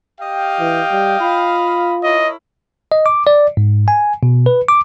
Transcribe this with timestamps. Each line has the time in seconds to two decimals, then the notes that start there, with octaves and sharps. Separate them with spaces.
0.21 G4 D#5 F5 G5
0.60 E3
0.92 G3
1.21 F4 B5
2.03 E4 A#4 C#5 D#5
2.92 D#5
3.06 D6
3.27 D5
3.57 G#2
3.88 G#5
4.23 B2
4.46 B4
4.68 D6